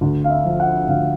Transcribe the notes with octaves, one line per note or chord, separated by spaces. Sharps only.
D2
F5
E5
F3
F#5
D2 F5